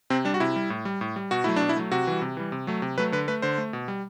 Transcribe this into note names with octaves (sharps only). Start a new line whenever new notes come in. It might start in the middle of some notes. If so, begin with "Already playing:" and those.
C3 C4
G3 D4
F#4
C3 E4
G3
A2
G3
A2
G3
B2 F#4
F#3 A3 E4
B2 D4
E4
F#3 A3
C3 F#4
E3 G3
C3
E3 G3
C3
F#3 A3
C3
F#3 A3 B4
D3 B4
A3 B4
D3 C5
A3
B2
G3